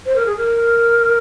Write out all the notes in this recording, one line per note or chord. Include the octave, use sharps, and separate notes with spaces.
C5
A#4
G#4
A#4